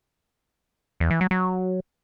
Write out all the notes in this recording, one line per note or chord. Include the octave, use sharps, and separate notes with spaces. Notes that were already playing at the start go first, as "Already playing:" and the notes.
E2
E3
F#3
F#3